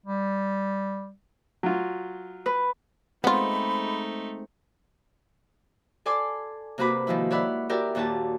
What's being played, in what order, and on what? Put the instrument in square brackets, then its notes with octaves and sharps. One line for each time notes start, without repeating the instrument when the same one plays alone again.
[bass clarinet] G3
[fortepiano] F#3 F4
[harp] B4
[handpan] G#3 C4 C5 [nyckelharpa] A3 D#4 [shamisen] B3 F4 [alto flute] B5
[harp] A4 D5 G#5 C6 D6
C3 A#3 F#4 B4 B5 D6
D#3 F3 G#3 E4
C#5 D5 E5 F#5 B5
F#4 G4 A#4 D5 E5 G5
D#2 A#2 F#4 G4 A5